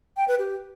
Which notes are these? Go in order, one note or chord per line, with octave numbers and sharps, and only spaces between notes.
G5
B4
G4